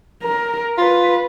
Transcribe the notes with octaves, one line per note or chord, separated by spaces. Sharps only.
A#4
F4 B4